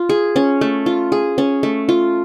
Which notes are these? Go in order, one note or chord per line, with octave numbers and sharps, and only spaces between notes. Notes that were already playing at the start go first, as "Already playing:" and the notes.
Already playing: F4
G#4
C#4
A3
F4
G#4
C#4
A3
F4